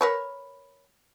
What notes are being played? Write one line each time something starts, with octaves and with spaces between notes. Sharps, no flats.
A#4 B4 C#5